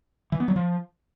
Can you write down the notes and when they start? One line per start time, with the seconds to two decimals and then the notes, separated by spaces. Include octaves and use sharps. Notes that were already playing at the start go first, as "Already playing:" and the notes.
0.32 E3
0.40 B3
0.48 F#3
0.56 F3